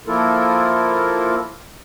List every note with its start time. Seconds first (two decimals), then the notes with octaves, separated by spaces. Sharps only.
0.07 F3 A#3 E4 F4 A4 A#4